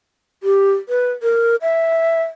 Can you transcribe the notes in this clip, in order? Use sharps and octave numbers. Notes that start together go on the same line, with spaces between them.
G4
B4
A#4
E5